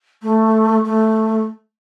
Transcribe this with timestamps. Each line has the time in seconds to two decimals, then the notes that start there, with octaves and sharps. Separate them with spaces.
0.22 A3
0.85 A3